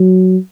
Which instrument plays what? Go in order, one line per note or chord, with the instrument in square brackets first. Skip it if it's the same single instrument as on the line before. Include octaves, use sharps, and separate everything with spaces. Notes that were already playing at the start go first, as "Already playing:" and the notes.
Already playing: [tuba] F#3